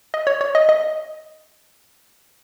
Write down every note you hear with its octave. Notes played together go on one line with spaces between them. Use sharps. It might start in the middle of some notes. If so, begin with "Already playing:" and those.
D#5
C#5
C#5
D#5
D#5